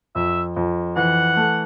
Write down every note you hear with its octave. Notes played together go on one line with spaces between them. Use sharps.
F2 E5
F2
E3 F#5
A3